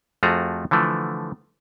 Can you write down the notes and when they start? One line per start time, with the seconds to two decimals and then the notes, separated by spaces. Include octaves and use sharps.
0.23 F2 F3 A3 F#4 G#4 A#5
0.71 D3 E3 F3 A3